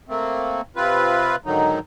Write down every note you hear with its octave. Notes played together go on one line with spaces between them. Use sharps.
A3 A#3 C4
C3 C4 F4 B4
G#2 D3 D#3 F#3 D#4